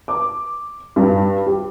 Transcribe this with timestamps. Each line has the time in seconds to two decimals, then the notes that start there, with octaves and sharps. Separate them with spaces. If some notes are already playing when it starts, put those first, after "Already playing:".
0.08 D6
0.96 G2
1.46 G4